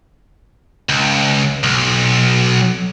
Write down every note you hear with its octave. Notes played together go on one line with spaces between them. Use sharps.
C#2
B1